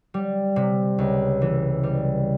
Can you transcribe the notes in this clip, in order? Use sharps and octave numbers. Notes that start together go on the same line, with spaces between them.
G3
C3
C#2
E3
G3